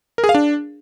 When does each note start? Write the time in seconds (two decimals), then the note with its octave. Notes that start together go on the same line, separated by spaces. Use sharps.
0.18 A#4
0.24 G#4
0.29 F5
0.35 D4